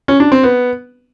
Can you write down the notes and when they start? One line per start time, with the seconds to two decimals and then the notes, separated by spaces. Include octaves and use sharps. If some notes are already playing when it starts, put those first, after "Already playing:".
0.08 C#4
0.20 D4
0.32 C4
0.43 B3